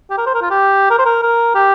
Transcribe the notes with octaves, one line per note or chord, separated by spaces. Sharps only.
G4
A#4
C5
A#4
F4
G4
A#4
C5
A#4
A#4
G4